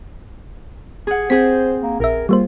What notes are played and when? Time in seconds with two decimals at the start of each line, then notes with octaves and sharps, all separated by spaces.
1.07 G#4 F#5
1.30 C4 G#4 C5 G6 B6
1.82 A#3
2.00 A#1 A#4 E5
2.29 G3 A#3 F4 C5